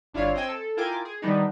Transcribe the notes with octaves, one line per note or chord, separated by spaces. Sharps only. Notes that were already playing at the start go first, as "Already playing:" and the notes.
G1 D4 E4 F4 C#5 F5
C4 D#5 G5 G#5 E6
A4
E4 F4 A#4 G5 G#5 D6
G#4
D#3 E3 G3 B3 D4 D#4